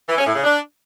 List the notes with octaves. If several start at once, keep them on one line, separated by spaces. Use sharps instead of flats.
E3
C#4
A2
C#3
D4